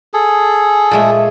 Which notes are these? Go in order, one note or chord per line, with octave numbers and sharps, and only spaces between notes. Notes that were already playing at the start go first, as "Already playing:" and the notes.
G#4 A4
A#2 G#3 A3